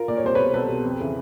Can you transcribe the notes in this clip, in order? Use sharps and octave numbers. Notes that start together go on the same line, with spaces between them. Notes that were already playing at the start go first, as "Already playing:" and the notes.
Already playing: F4 A#4
A#2 D5
C#5
C2 C5
B2 B4 C#5
C2 A4 B4
B2
F2
C#3 E3